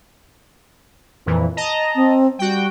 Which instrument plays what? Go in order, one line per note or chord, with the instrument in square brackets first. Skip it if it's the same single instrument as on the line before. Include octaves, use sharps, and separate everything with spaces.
[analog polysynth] F2 A#2 E3
D#5 A5 A#5
[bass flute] C4
[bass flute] G3 [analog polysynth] F#4 G5